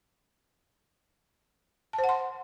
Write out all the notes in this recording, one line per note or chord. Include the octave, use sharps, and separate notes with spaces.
A5
C5
F#5
C6